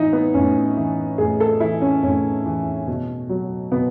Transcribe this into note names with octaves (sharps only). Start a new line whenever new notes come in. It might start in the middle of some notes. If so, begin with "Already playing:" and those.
Already playing: A2 E3 D#4 E4
B3
A2 C#4
E3
A2 G#4
A4
E3 E4
C#4
A2 C#4
E3
B2
F#3
B2 B3